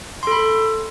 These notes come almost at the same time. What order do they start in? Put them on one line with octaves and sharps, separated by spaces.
C6 A4 B5